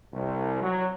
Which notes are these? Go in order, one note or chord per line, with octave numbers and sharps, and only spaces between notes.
C2
F#3